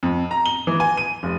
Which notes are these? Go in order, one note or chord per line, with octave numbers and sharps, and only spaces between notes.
F2
A#5
G7
E3
G#5
D#7
F1